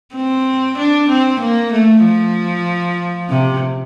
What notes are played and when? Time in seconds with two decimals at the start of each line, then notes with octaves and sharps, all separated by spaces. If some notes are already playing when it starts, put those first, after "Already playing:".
0.15 C4
0.78 D4
1.09 C4
1.40 A#3
1.73 A3
2.03 F3
3.30 C3